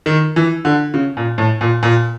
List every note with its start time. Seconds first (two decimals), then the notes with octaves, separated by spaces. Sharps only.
0.06 D#3
0.36 E3
0.65 D3
0.94 C#3
1.17 A#2
1.38 A2
1.61 A#2
1.83 A#2